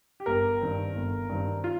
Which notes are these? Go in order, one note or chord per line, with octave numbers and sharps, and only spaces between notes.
G4
G1 A#4
G2 D#3 C4
G1
G2 D#3 C4
F4